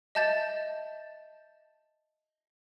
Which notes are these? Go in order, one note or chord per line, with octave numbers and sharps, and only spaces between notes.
D#5 E5 A5 G6 A6 E7